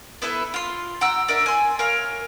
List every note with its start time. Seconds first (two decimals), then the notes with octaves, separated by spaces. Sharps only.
0.22 B3 E4 A4 B4
0.54 F4 C6
1.01 F#5 G5 A#5 E6
1.28 D4 A#4 E5
1.46 G#5 C6
1.79 A#4 C#5 F5